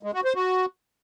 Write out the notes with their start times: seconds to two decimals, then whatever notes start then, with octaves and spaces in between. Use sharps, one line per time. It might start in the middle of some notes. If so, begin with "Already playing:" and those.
0.03 G#3
0.14 F#4
0.25 C5
0.35 F#4